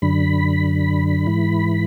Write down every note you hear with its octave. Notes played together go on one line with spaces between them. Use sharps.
F#2 D3 B5
G#2 E3